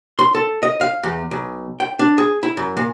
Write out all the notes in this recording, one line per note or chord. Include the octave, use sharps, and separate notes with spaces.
C6
A4
D#5
F5
E2
B1
G5
D4
G#4
E4
F#2
A#2